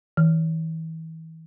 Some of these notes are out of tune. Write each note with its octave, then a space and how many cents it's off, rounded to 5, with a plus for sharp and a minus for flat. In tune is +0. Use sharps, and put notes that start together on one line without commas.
E3 -35